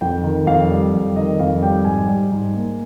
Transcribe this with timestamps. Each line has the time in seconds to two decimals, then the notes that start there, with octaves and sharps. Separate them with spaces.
0.01 F2 G5
0.24 D#3
0.47 F2 F5
0.70 G3
0.93 F2
1.16 D#3 D#5
1.39 F2 F5
1.62 G3 G5
1.85 G#2 G#5
2.08 G3
2.32 G#2
2.54 A#3